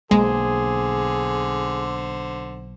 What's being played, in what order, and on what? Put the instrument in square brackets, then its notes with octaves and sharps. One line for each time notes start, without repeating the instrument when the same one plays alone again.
[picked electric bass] B1 A#3 [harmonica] D3 C5 [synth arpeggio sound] G#3 [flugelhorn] G#4